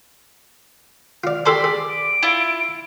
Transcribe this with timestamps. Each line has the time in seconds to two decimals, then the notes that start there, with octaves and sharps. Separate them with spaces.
1.24 F4 D5 F6
1.46 G4 A4 D5 G#5 C6 B6
1.64 G#4
1.89 D7
2.23 E4 F4